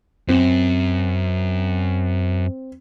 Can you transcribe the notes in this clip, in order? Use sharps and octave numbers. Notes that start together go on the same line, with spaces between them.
F#2 C4